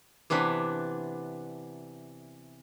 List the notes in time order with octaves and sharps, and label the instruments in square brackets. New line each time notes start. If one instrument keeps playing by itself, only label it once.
[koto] C3 E3 B3 D4